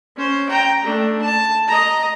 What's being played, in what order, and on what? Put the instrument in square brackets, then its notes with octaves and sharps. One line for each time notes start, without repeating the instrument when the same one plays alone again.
[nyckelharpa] C#4 C5
G5 A#5
A3 D4
A5
D#5 A#5